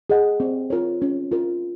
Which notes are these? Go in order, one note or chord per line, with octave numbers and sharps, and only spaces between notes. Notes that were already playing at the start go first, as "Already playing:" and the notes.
G#4 D#5 F#5
C4
F4 A#4 C#5
C#4
F4 A#4